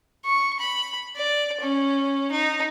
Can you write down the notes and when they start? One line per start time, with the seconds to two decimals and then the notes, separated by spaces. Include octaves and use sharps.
0.25 C#6
0.59 B5
1.15 D5
1.60 C#4
2.31 D#4